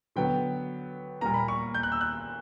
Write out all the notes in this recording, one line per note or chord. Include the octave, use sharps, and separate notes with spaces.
D3 F#3 B3 G5
A#2 G3 A#3 A#5
B5
C#6
G6
F#6
E6
F#6